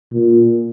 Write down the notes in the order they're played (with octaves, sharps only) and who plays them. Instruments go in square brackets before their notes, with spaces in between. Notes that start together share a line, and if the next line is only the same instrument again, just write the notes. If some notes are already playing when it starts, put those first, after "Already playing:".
[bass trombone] A#2